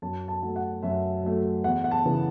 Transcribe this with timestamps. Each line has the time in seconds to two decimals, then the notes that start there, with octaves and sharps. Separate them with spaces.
0.02 F#2 A5
0.28 A5
0.42 F#3 A3
0.56 F#5
0.83 F#2 E5
1.23 F#3 A3
1.64 E2 F#5
1.84 F#5
1.91 A5
2.05 C#3 E3 B3